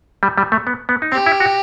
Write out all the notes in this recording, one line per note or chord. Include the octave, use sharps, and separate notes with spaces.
G3
G3
A3
B3
B3
D#4
C4 G4
E4
F#4